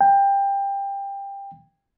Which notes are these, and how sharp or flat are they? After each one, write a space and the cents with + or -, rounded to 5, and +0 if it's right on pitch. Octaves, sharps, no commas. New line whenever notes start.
G5 +20